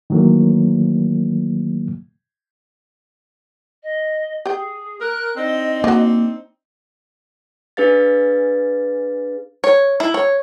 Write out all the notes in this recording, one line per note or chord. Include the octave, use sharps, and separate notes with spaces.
D#3 E3 F#3 A3 A#3
D#5
G4 G#4 G5
A#4 F#6
C4 D4 D#4 D#5
F3 A#3 F#4
D4 G#4 B4 F5 A6
C#5
E4
C#5